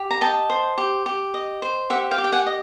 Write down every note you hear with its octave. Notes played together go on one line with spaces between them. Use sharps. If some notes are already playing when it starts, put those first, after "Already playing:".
Already playing: G4
A#5
D#5 G5 A5
C5
G4
G4
D#5
C5
G4 E5 F#5
F5 G5
G4
G5
F#5 G#5
D#5